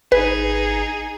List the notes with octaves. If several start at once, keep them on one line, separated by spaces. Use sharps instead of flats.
G#1 D#4 G#4 B4